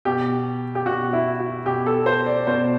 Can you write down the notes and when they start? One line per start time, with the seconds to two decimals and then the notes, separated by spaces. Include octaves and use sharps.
0.05 B2 G4
0.75 G4
0.86 B2 F#4
1.13 E4
1.39 F#4
1.66 B2 G4
1.86 A4
2.06 C5
2.26 D5
2.47 B2 C5